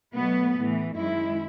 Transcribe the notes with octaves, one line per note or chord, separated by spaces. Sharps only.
B2 F#3 A3 B3
A2 E3 A3
F#2 D#3 G#3 E4